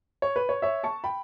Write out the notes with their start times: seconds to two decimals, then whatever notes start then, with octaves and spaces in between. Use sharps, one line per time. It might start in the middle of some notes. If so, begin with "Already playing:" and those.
0.22 C#5
0.36 B4
0.49 C#5
0.62 C#5 E5
0.84 A5 C#6
1.04 G5 B5